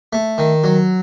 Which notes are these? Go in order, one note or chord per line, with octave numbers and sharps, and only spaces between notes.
A3
D#3
F#3